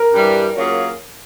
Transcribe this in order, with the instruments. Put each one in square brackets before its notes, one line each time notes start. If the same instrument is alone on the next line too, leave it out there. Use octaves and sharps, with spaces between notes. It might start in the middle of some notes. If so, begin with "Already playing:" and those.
Already playing: [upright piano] A#4
[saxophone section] G2 E3 G3
F#3 A#3 C#4 F4 G#4